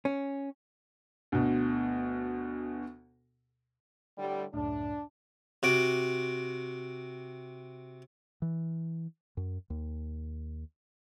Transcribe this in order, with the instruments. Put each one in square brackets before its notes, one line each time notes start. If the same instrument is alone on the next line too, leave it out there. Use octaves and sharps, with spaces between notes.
[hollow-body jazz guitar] C#4
[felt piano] D2 B2
[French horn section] A2 D3 G3
[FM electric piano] C#2 F#2 A2 [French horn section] D4
[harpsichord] C3 F#4 D6
[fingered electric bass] E3
F#2
D#2